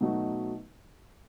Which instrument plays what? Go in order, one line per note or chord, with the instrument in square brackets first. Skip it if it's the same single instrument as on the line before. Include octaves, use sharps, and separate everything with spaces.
[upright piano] B2 F#3 A3 D#4 F#4